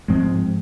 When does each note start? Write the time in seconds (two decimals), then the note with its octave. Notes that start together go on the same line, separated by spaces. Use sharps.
0.08 G#2 F3 G#3 C4